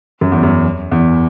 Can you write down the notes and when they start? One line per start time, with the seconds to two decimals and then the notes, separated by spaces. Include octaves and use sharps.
0.21 F#2
0.32 E2
0.43 F#2
0.92 E2